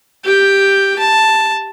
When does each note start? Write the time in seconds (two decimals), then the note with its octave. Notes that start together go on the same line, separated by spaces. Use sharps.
0.24 G4 G5
0.99 A5